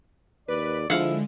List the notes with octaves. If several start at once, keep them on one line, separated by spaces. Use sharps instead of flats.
D#2 B4 D5
D3 F3 G#3 E4 F5 F#5